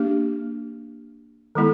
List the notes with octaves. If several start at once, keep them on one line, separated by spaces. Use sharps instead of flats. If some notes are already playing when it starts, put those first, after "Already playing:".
Already playing: A#3 D4 G4
D#3 G#3 B3 E4 A4